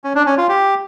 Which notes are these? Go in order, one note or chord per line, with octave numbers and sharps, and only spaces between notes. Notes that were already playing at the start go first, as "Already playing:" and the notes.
C#4
D4
C#4
F4
G4